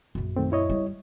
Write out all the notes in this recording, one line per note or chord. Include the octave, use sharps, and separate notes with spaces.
A#1 F#2
D#3 A3 C4
E4 C#5 D#5
G3